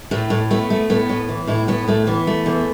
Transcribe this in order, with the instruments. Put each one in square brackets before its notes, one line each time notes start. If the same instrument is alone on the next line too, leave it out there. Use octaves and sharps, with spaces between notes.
[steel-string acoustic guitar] A2 A3
A2
A3 B3
A3
A2 B3
A2
E3
A2 E4
A2 B3
A2 A3
E3 B3
A3
E2